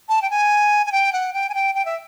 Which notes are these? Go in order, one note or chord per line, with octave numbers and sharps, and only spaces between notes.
A5
G5
G#5
G#5
G5
F#5
G5
G#5
G5
G5
E5